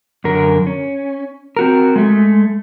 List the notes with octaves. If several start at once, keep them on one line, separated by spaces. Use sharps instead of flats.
F#2 D3 A#4
C#4
C4 F#4 A#4
G#3 A3